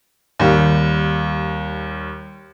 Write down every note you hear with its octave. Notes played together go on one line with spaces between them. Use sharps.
D#2 G3